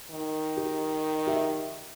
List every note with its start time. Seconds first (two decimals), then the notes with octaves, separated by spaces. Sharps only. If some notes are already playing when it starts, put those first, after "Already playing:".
0.11 D#3
0.57 G4
1.27 G4 E5